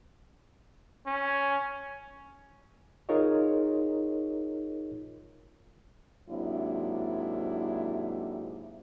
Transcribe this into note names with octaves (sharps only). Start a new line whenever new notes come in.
C#4
D#4 F4 G#4 A#4 C#5 D#5
G#2 C3 F#3 A#3 D4 E4